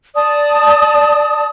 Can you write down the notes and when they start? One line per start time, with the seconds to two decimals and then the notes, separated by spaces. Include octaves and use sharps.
0.15 D5 A5 D#6